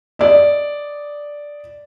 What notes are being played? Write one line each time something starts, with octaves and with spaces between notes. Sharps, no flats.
D5 D#5